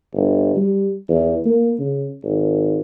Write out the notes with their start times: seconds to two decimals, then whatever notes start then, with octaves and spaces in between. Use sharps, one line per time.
0.14 G1
0.57 G3
1.09 E2
1.46 A#3
1.80 C#3
2.24 G#1